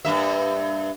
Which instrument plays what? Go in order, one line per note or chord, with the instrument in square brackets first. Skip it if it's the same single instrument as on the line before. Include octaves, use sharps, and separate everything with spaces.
[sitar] G2 A#3 E5